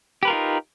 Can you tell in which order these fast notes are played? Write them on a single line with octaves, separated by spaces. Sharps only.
G4 B4 A#4 F4 D#4